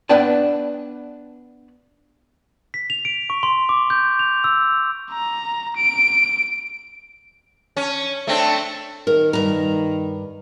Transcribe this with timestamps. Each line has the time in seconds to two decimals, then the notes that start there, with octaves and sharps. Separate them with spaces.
0.09 B3 D4 B4 D5 G5 A5
2.74 B6
2.90 F7
3.05 D7
3.30 C#6
3.43 C6
3.69 D6
3.90 G6
4.19 F7
4.44 E6
5.12 A#5
5.77 D7
7.77 C#4
8.27 A3 C4 D4
9.07 D#3 A#4
9.33 G2 A#5